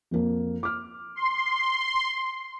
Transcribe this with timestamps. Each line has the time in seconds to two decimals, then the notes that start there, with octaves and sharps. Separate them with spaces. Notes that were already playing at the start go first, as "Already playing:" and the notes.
0.11 F2 A#3
0.63 D6 F6
1.16 C6